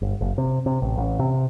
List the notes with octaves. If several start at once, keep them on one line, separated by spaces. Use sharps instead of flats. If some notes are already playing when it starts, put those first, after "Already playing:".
G1
F#1
C3
C3
A1
A1
C3